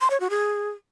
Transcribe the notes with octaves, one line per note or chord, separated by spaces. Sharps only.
C6
C#5
F#4
G#4